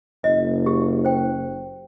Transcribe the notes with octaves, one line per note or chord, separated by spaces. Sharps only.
F#1 D#5
G4
C5 G5